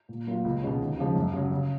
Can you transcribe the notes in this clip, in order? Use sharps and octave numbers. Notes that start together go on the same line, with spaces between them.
A#2
F#3 A#3 F4
C#2
B2 G#3 C#4
D#2
C#3 F3 G#3
F#2
C#3 F#3
C#3